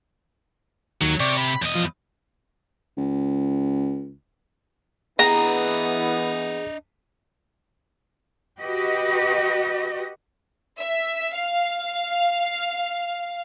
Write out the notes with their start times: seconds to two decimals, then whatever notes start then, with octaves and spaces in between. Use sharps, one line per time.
1.01 D#2 F#3
1.20 C3 D5 C#6
1.37 B5
1.62 E2 D#5
1.75 F3
2.97 C#2
5.19 E3 B3 D4 G#4 D#5 A#5
8.60 F#4 G4 B4 D#5
10.79 E5
11.35 F5